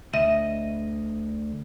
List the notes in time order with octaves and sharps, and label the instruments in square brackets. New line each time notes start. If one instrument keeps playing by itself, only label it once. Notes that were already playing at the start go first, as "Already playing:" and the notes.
[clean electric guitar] D2 D#5 [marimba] E5